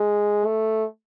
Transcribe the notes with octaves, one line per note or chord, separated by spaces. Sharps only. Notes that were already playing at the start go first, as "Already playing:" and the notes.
Already playing: G#3
A3